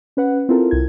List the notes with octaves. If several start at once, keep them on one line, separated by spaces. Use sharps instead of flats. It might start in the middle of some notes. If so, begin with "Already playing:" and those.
C#4 B4 F#5
C4 E4 F4 A4 A#4
C2 E4 G#6